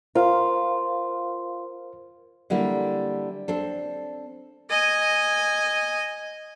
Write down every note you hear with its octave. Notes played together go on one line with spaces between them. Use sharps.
F4 A#4 C5 F5
D3 G3 A#3 E4
C4 D4 A4
D#5 G#5